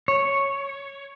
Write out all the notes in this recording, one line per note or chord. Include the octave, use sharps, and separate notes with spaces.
C#5